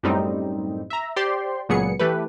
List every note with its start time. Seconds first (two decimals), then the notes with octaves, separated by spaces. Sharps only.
0.03 F#2 A2 G3 C4 D#4
0.90 E5 A#5
1.16 G4 C5 D5 G5 C6
1.69 C#2 A#2 F#3 B3 G#4 C#7
1.99 E3 A3 G4 B4